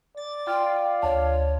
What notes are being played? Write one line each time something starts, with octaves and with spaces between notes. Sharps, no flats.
D5 A6
F4 G5
D2 C#5 A5